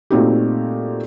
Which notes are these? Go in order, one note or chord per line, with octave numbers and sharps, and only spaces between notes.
A#2 A3 C4 D#4 F#4 G4